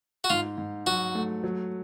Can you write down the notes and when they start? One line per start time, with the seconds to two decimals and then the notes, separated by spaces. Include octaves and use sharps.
0.24 F#4
0.30 G#2 F4
0.58 G#2
0.87 F#3 F#4
1.15 A3
1.44 F#3